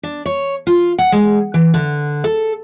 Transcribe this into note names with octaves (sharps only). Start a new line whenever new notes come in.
D4
C#5
F4
F#5
G#3
E3
D3
A4